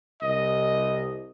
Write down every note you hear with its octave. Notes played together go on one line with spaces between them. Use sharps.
C2 D#5